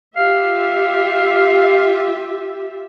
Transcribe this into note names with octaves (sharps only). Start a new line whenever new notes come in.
F4 G4 E5 F5